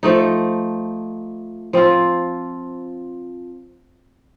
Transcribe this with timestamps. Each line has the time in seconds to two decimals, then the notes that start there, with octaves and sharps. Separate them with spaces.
0.03 F3 A3 D#4
1.73 F3 C4 F4